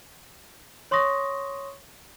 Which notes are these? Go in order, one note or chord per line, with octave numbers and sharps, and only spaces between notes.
C#5 C6 C#6 D#6 A#6